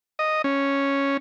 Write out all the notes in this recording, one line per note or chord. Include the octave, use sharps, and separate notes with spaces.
D#5
C#4